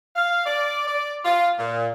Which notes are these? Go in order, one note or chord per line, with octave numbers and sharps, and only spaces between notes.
F5
D5
D5
F4
A#2